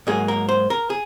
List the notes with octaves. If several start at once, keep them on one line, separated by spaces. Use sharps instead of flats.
G#2 F#3 A#3 G#4
A#4
C5
A#4
G#4